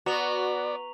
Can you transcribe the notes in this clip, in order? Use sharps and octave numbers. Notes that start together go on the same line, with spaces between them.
B3 F#4 D5 A#5 C#6 F7